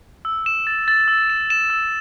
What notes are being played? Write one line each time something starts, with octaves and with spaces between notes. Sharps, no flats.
E6
E7
A6
A6
E6
E7
E7
E6